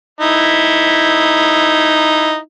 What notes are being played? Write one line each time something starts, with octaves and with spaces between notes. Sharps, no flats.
D#4 E4